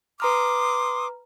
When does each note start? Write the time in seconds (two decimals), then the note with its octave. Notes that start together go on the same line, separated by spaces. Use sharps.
0.20 B4 A#5 C6 D6 D#6 F6